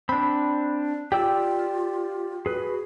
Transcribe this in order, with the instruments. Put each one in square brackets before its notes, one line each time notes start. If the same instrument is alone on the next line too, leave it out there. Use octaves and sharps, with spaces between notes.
[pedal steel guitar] C4 D4 [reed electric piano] B5
[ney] F4 [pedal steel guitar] G4 D5 E6 [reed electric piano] G5
[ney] F#4 [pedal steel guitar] G#4 B4